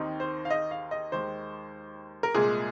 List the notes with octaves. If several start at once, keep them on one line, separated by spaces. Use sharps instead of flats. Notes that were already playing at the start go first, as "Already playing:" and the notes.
Already playing: D#2 D#3 C4 D#4
C5
F5
D#5
F5
D#5
D#2 D#3 G#3 C5
A#4
C2 A#2 G#3 G#4